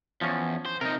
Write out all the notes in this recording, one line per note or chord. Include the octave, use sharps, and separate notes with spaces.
E2 F3 C#4
C5
C3 D#4 A#4